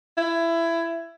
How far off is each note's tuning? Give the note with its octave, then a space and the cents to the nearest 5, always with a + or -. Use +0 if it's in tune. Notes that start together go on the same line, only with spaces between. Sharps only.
E4 +20